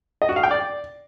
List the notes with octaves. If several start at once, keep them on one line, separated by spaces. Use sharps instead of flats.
D#5
F#4
F5
G5
D5